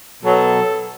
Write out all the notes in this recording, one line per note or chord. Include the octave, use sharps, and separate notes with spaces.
B2 F#3 A4